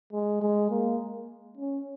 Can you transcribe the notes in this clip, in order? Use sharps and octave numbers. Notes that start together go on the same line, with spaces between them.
G#3
G#3
A#3
C#4